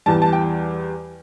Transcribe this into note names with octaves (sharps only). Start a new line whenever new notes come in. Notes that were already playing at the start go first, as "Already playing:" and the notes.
E2 E3 G3 A5
A5
G5